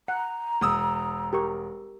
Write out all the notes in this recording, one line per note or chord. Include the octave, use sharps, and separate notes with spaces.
F#5 A#5
E1 D#6 E6
G4 A#4 C#6